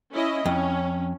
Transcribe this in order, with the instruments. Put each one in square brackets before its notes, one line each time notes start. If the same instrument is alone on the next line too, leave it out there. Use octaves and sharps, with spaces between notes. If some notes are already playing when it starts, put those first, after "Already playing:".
[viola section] C#4 E4 D#5
[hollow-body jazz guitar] F2 [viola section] C#4